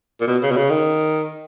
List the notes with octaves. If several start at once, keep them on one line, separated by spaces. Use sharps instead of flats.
A#2
B2
C#3
B2
C#3
D#3